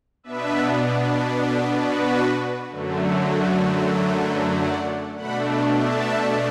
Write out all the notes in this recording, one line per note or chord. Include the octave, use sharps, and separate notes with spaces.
B2 B3 D4 B4 E5
A4 D5
F#4 B4
F#2 D3 F#3 A3
F#4
A4
F#4 B4
D5 F#5
B2 A3 D4 F#5 B5
E5 A5